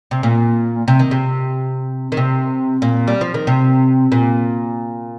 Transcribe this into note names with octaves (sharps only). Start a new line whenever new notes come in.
C3
A#2
C3
D#3
C3
D#3
C3
A#2
G3
F3
D#3
C3
A#2